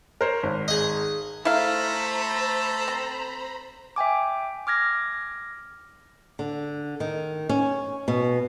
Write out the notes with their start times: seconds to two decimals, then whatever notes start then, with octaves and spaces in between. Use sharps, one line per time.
0.21 A#4 C5 C#5
0.43 G#1
0.68 G#4 D#5
1.45 A3 E4 A4 C5 F5 A#5 B5
2.88 C4
3.96 E5 G5 G#5 D6
4.67 D6 F6 G#6 A#6
6.39 D3
7.00 D#3
7.49 C#4
8.08 B2